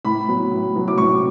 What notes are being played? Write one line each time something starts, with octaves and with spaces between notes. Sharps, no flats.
A2 B5
F#3 B3
A2
F#3 B3
D6
A2 C#6